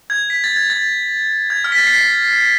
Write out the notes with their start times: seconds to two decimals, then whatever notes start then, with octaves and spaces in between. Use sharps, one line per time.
0.10 G#6
0.30 B6
0.44 A6
0.56 G#6
0.70 A6
1.50 G#6
1.64 F6
1.72 B6
1.78 A6
1.87 C7
1.90 B6